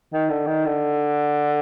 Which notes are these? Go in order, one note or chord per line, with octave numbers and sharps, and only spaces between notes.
D#3
D3
D#3
D3